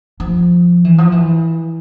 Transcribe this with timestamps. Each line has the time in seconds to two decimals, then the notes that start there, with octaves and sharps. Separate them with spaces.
0.20 F3
0.85 E3
0.98 F3
1.12 E3